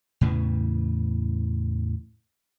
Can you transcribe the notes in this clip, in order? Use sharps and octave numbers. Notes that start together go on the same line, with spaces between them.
E2 A2 C#3 E3